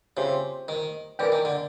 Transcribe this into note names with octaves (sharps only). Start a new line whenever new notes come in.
C#3 G4 C5 E5
D#3
E3 A#4 D5 G5
D#3
D3